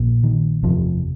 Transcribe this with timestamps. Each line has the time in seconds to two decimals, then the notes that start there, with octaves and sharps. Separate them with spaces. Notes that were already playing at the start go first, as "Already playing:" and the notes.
Already playing: A#1 A#2
0.23 D#3
0.63 F#1 E2 C3 F3